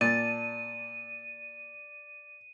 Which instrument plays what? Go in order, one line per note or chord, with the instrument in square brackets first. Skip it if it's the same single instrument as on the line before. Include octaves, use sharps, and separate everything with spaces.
[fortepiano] A#2 [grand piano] D5 [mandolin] A5 [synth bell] D#7